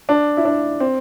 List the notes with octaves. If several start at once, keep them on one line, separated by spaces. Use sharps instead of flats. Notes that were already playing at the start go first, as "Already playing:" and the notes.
D4
E4
D4
C4